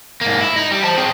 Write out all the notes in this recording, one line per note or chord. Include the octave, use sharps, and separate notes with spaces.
G#2 A#3
E4
D#4
G3
C5 A5
C4 G#4